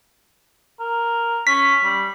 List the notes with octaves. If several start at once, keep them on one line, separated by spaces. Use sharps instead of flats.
A#4
C#4 B6
G3